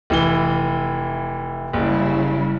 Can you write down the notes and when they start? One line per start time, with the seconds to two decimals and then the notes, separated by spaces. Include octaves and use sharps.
0.10 F1 E3 G7
1.73 F#1 C#3 G3 E4